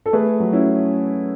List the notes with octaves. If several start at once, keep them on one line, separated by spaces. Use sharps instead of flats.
A4
A3 G#4 B4
F#3
C#4 E4